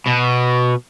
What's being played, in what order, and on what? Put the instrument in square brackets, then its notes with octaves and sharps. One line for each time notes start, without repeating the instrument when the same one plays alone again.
[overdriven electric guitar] B2